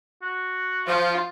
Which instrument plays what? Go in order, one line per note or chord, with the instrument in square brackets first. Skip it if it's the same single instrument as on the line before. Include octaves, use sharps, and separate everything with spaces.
[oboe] F#4
[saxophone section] F3 [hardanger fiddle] F4